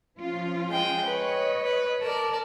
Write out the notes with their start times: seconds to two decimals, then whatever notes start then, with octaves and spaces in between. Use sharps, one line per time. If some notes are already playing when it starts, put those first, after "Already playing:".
0.19 F3 C#4 F4
0.70 G#3 G5
1.06 B4 C#5 D#5
1.63 B4
2.02 A#4 D5 A5